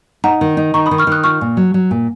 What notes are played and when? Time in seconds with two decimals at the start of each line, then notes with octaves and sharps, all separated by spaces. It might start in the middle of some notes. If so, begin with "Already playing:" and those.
0.24 D#4 F#5 A#5
0.41 D#3
0.57 D#4
0.74 D#3 A#5 C#6
0.86 B5 D#6
0.91 D#3
0.98 C#6 F6
1.07 D#3 D#6 F#6
1.24 F4 C#6 F6
1.41 A#2
1.57 F#3
1.74 F#3
1.91 A#2